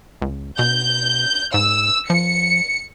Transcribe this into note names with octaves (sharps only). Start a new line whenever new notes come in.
C#2
B2 G6
G#2 E6
F3 C#7